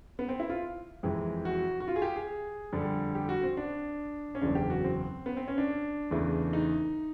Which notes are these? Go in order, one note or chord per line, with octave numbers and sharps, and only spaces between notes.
B3
C4
E4
F4
F2 C3 E3 G#3
F#4
F#4
F4
G#4
G4
G#4
F2 D3 G3
G4
F#4
C4
D4
C#4
F#1 E2 C#3 D4
G4
F#4
C4
B3
C4
C#4
D4
E2 C#3 E3 A3
D#4